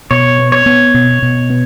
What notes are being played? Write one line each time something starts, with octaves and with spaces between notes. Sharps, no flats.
B2 C#5
B3
C#5
B3
B2
B2
B3